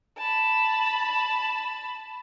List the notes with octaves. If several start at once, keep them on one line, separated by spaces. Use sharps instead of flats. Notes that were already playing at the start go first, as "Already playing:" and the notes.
A5 B5